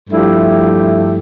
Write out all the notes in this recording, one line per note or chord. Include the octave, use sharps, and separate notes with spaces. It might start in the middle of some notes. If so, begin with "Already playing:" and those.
G2 F3 A3 E4 G4